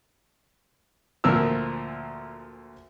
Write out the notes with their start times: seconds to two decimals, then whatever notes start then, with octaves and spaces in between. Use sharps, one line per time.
1.24 D2 A#2 F3 A#4 E6